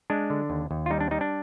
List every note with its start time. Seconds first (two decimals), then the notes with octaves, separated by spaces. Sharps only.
0.10 G#3 D4
0.30 D3
0.50 D#2
0.71 D#2
0.86 F4
0.90 G3 D#4
1.00 D4
1.11 G3 D#4
1.21 D4